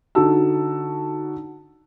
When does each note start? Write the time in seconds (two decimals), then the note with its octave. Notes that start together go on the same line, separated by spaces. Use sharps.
0.15 D3 D#4 F#4 A5 E6